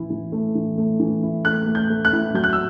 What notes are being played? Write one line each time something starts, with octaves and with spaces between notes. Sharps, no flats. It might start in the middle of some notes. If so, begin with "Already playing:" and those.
Already playing: E3 E4
E3
A3
E3
A3
E3
E4
A3 F#6
A3
G6
A3
F#6
E4
F#3 G6
F#6
E6